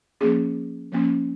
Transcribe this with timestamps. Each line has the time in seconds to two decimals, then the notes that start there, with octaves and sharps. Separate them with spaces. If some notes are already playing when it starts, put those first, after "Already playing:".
0.21 F3 A#3 C#4 G#4
0.92 F3 A#3 C#4